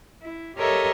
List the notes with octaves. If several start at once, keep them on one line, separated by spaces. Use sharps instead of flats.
E4
G4 A4 A#4 C#5 D#5 E5